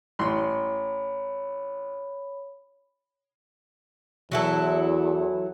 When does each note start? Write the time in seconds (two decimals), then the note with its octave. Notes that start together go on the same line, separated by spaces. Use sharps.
0.19 A1 C#5 B5 C6
4.32 E2 F#3 E4 A4